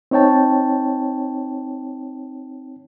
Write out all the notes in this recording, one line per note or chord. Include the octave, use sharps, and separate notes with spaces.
C4 D#4 C#5 G5 A5